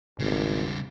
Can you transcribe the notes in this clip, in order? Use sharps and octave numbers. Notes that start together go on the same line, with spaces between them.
G#1 C#3 G3